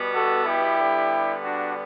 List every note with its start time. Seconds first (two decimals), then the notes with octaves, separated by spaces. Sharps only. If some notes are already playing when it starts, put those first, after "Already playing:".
Already playing: B2 G3 B3
0.14 F#4 A4
0.46 E4 G4
0.78 D3 G3 B3
1.43 D4 F#4